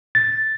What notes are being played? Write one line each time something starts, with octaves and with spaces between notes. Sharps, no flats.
A6